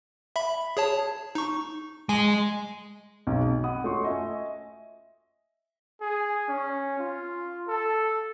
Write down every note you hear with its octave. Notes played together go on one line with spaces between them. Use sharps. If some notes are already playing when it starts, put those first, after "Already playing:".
E5 B5
G#4 C#5 A5
D#4 C#6
G#3 G#5
B1 B2 G#3
C3
D#5 F#5 B5 D#6
A3 C#4 F4 F#4 C6 C#6
D#5 E5 G#5
G#4
C#4
F4
A4